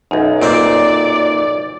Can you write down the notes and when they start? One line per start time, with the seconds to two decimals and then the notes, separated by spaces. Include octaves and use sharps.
0.11 B1 F#2 D#4
0.42 A#2 C4 D5